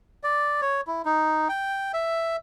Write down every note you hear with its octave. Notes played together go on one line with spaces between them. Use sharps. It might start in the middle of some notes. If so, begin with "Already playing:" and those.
D5
C#5
E4
D#4
G5
E5